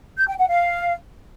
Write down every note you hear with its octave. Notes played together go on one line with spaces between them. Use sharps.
G6
G5
F#5
F5